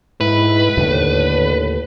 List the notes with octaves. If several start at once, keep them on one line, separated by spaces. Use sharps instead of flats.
G#2 E4 B4
D#2 A2 D3